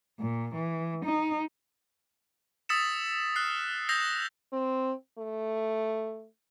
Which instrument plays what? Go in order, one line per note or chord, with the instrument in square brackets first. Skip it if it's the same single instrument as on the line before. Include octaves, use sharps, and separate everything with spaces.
[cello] A#2
E3
D#4
[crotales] D#6 E6 A6 B6 C#7 E7
F6 F#6 C7
D#6 E6 G6 A#6 C7 F7
[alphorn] C4
A3